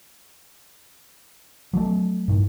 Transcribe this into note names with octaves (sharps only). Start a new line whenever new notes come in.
F#3 A3
G2 A#2